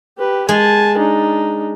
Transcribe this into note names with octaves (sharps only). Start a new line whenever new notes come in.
G4 B4
G#3 G#5 A5
D4 D#4